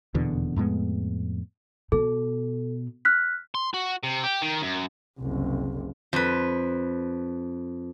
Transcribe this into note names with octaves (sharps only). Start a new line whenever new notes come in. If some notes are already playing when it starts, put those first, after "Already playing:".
D#1 E2 B2 D3
F2 A2 G#3 B3
B2 A4
F6 F#6 B6
C6
F#4
C3
G4
D#3
F#2
F#1 C2
F2 B4